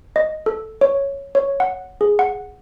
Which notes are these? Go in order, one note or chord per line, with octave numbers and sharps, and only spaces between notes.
D#5
A4
C#5
C#5
F#5
G#4
F#5